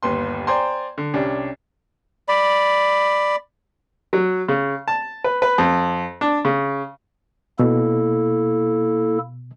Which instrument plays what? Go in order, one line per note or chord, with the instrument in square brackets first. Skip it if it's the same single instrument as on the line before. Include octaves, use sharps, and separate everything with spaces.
[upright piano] G1 D#2 B4 C6
C5 D5 G5 G#5 A#5 C6
D3
C2 C#4 D4 G4
[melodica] D5 B5
[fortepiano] F#3
C#3
A5
B4
B4
F2
D4
C#3
[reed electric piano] B2 [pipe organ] A#3 E4 A4